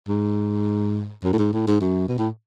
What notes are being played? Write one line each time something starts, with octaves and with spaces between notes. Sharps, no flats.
G#2
F#2
A2
G#2
A2
G#2
F#2
B2
A2